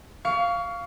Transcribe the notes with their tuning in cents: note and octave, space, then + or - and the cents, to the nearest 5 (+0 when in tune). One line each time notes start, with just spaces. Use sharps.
F5 +0 C#6 +30